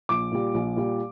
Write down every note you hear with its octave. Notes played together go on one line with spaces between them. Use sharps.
A#1 D6
A#2 G3
A#1
A#2 G3